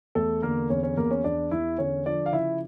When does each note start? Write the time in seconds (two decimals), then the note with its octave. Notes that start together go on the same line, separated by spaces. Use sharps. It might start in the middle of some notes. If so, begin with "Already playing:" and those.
0.15 E2 A3 A4
0.42 D3 A#3 A#4
0.70 E2 C#4 C#5
0.83 C#4 C#5
0.97 E2 A#3 A#4
1.11 C#4 C#5
1.24 E2 D4 D5
1.51 E2 E4 E5
1.78 D3 C#4 C#5
2.06 F3 D4 D5
2.26 F5
2.33 C#3 E4 E5